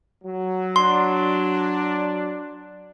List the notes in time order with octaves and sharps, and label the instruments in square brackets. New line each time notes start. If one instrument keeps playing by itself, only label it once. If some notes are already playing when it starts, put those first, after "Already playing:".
[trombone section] F#3
[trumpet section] D4 [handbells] C6